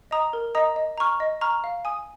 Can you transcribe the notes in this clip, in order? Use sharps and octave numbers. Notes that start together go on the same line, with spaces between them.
D#5 A#5 D#6
A#4
D#5 A#5 D#6
D#5
A#5 C#6 F6
D#5
A#5 C#6 F6
F5
G#5 D#6